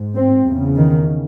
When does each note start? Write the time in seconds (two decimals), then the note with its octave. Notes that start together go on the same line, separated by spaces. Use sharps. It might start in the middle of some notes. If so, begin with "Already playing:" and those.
Already playing: G#2
0.16 C4
0.47 E2 C#3
0.77 D#3